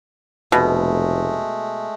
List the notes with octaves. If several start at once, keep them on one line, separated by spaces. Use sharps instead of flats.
F1 B2 G#3 A3